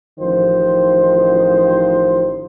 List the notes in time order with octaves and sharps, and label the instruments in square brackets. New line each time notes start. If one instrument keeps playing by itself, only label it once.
[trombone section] A1 D#3 F3 C5